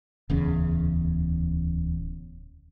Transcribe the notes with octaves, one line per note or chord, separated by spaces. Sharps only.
D1 E2 C#3